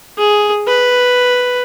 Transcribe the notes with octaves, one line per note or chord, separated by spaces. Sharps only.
G#4
B4